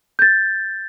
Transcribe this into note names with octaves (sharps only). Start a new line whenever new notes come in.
G6 A6